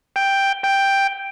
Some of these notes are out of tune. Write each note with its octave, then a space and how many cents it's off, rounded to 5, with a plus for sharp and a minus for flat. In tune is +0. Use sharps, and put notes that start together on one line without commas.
G5 +5
G5 +5